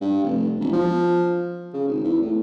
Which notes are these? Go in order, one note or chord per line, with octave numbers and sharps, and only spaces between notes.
G2
F1
E1
F3
C#3
G#1
E2
A2